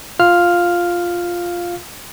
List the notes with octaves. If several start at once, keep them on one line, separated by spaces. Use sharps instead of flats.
F4 F5 F6